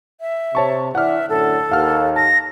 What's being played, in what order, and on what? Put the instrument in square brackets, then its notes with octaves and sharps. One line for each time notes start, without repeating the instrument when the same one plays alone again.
[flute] E5
[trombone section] C3 [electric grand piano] C#5 A5 C#6
[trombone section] E3 D4 [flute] E5 [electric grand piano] F#5 F6
[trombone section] F#2 A2 D3 [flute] A4
[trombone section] D#2 [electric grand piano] F5 F#5 F6
[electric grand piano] A5 [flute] A#6